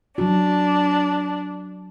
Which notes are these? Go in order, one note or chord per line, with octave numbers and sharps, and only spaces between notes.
F#3 D4 F#4